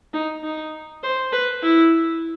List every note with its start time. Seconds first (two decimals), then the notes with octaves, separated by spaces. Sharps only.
0.14 D#4
0.44 D#4
1.03 C5
1.33 B4
1.63 E4